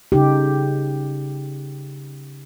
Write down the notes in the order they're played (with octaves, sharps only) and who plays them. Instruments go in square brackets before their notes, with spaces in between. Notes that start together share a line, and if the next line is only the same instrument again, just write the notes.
[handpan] C#3 D#4 G4